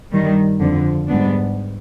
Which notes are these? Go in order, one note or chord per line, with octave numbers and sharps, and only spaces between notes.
G2 D#3 G3
F2 D3 F3
G#2 G3 B3 D4